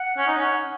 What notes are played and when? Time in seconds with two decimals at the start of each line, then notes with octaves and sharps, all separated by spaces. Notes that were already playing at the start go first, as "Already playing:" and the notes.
Already playing: F#5
0.18 C#4
0.28 D#4
0.37 C#4